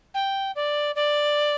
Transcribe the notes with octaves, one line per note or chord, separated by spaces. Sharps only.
G5
D5
D5